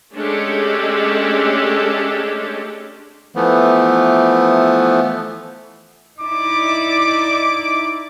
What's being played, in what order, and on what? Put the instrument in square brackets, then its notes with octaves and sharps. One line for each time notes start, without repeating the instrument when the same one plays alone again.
[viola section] G#3 A3 C#4 D4 G4 A4
[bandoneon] E3 F3 A3 B3
[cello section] D#4 E4 D5 [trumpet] D6